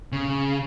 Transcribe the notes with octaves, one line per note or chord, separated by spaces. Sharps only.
C#3